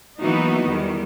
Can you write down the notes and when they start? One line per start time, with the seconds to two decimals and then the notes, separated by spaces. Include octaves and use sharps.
0.20 E3 F#3 A#3 B3 D#4 F#4
0.65 E2 D#3 G3